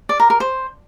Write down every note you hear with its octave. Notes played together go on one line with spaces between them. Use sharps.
D5
A#4
A#4
C5